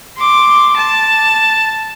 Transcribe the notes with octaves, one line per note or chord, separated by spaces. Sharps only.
C6 D6
A5